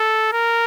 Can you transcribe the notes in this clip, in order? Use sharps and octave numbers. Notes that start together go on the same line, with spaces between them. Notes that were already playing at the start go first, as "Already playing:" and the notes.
Already playing: A4
A#4